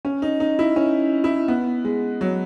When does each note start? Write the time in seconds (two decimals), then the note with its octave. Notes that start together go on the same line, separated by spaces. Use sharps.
0.05 C#4
0.22 D#4
0.40 D#4
0.59 E4
0.76 C#4
1.24 E4
1.48 B3
1.85 G#3
2.21 F#3